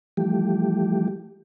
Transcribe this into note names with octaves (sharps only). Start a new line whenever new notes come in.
E3 F3 G3 A3 G4